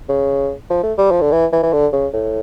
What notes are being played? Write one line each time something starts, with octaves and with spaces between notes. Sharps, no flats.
C#3
F3
A3
G3
F3
D3
E3
E3
E3
D3
C#3
A2